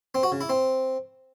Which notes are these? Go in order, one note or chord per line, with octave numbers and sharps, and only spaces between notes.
C4
F#4
C#3
E4
C4